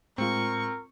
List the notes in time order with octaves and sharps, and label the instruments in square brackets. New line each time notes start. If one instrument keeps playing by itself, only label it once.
[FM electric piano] A2 G#3 F4 [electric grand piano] C4 [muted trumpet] A#4 [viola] C#6